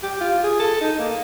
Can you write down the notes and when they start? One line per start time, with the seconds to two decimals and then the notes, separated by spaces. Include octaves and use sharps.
0.03 G4
0.21 F4
0.44 G#4
0.59 A4
0.81 D#4
0.99 A#3